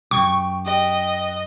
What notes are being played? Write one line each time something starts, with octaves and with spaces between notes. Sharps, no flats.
C2 F#2 G4 C#6
G4 B4 D#5 D#6